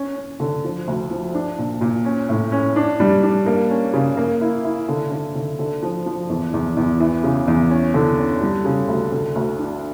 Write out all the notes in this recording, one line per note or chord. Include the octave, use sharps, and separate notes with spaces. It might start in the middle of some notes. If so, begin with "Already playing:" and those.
Already playing: C#4
C#4
D3
F3
D2
F3
D4
A#2
A#2
C#4
A2
C#4
D4
G3
D4
A#3
C#4
C#3
A#3
E4
E4
D3
D3
D3
D3
F3
F3
E2
E2
E2
E3
C#3
E2
C#4
D3
C#4
G3
C#3
D2
D3
D2
D4